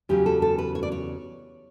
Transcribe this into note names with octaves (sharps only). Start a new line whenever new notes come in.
E2 C#3 F#3 G4
A4
A4
B4
C#5
D5
C#5